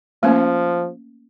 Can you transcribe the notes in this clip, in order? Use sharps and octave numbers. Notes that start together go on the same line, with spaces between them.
F3 A3 A#3 C#4